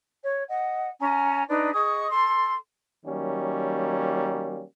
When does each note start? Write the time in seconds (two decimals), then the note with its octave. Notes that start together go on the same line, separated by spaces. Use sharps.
0.22 C#5
0.49 D#5 F#5
1.00 C#4 G#5 A#5
1.48 D4 D#4 B4
1.74 G#4 D#5 C#6 D#6
2.10 A4 C6
3.05 D#3 F#3 G3 A#3 C#4